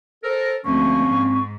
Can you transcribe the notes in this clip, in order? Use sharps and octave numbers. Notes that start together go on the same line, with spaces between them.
A4 A#4 C5
D2 F3 A#3 C4 C#4 C#6
G#2